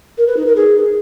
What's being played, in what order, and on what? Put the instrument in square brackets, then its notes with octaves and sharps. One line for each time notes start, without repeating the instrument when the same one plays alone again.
[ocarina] A#4
B4
D#4
A#4
G#4